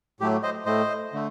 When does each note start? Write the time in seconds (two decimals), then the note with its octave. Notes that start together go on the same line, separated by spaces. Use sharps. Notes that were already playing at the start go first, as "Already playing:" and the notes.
0.20 A2 F#3 A3 G4
0.43 C5 D#5
0.66 A2 A3 C5 D#5
1.13 D3 A3